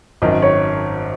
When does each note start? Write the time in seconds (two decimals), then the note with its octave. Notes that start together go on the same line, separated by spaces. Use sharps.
0.22 G#1 F#2 D#3 D#5
0.42 C#5